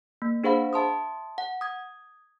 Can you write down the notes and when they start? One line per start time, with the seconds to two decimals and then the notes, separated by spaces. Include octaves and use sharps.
0.22 A#3
0.44 D4 G#4 C5 F5 F#5 B5
0.73 E5 A5 C6 D#6
1.38 F#5
1.61 D#6 G#6